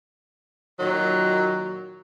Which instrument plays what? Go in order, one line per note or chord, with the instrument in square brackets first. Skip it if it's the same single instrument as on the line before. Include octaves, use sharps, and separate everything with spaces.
[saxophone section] A#2 D#3 F#3